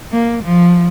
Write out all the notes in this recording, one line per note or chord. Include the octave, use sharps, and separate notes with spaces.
A#3
F3